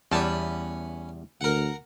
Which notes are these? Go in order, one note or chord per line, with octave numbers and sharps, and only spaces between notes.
E2 G3 C#4 B4 A5
D2 A#4 F#5